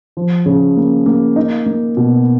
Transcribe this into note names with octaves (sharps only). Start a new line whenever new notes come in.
F3
C#3
A#3
A#3
D#4
A#3
B2